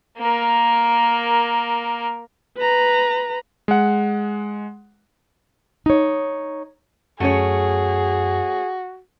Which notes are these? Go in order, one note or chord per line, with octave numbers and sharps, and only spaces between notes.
A#3 A#4
B4 A#5
G#3 F#5
D#4 C#5
F#2 A3 C#4 F#4 G#4 C#5